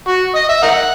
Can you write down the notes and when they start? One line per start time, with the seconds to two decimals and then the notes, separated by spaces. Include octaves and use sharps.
0.08 F#4
0.35 D#5
0.49 E5
0.63 A#4 D#5 F#5